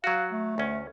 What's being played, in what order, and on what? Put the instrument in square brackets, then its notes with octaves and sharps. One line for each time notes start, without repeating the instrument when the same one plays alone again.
[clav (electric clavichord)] F#3 F#4 [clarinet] F5
[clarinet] A3
[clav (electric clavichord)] D2 C#4